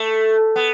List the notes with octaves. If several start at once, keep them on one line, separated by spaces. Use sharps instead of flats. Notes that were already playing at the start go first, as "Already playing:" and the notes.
Already playing: A3
B3